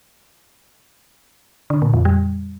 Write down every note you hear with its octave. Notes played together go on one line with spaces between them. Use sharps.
D3
A#2
F2
G3